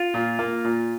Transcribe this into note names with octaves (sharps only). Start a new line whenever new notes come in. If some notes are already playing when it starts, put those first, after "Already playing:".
Already playing: F4
A#2
A#3
A#2